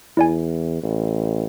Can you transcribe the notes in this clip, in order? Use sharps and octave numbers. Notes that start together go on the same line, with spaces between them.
E2 E4 D5 G#5
A1